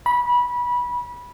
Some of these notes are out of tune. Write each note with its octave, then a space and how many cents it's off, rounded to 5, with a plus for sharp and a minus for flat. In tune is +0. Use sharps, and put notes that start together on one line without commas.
B5 -20